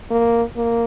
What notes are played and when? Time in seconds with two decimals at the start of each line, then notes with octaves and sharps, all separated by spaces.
0.11 A#3
0.57 A#3